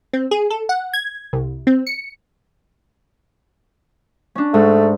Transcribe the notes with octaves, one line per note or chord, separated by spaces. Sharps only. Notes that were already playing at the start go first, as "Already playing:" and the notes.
C4
G#4
A4
F#5
G#6
C2
C4
C#7
C#4 D4
G#2 A3